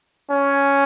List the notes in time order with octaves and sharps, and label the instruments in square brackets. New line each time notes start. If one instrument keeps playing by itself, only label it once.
[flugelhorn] C#4